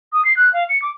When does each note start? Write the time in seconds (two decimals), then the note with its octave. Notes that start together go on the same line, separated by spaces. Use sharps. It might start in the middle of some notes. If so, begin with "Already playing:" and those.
0.13 D#6
0.25 C7
0.37 F#6
0.53 F5
0.69 C#7
0.82 D6